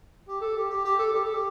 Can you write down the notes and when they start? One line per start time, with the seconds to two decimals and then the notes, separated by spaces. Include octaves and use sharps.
0.28 G4
0.41 A4
0.57 G4
0.70 G4
0.85 G4
0.99 A4
1.13 G4
1.24 A4
1.34 G4